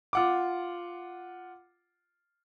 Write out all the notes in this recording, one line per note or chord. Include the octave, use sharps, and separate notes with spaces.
F4 F#5 D6